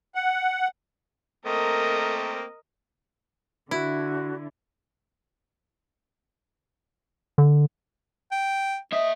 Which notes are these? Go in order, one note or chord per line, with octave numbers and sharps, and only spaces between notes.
F#5
A3 A#3 C4 A#4 D#5
D3 E4 F#4
D3
G5
A#3 D#5 E5